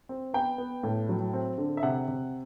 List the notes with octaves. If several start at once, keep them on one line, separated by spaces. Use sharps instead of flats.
C4
B3 G5
B3
A2
F#3
C4
D3
E5
C3 F#5
C3